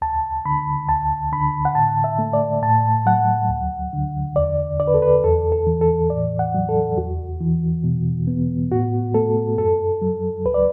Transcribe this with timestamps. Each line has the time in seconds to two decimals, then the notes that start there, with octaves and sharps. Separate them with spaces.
0.02 D2 A5
0.45 D3 B5
0.88 D2 A5
1.32 D3 B5
1.65 F#5
1.75 A2 A5
2.04 E5
2.19 A3
2.33 D5
2.62 A2 A5
3.06 F#3 F#5
3.49 D2
3.93 D3
4.36 E2 D5
4.80 D3 D5
4.88 B4
4.94 A4
5.02 B4
5.24 E2 A4
5.52 A4
5.67 E3
5.81 A4
6.10 A2 D5
6.39 F#5
6.55 F#3
6.69 A4
6.97 E2 F#4
7.40 E3
7.84 B2
8.27 B3
8.71 A2 F#4
9.14 A3 A4
9.58 F#2 A4
10.02 F#3
10.45 D2 B4
10.54 D5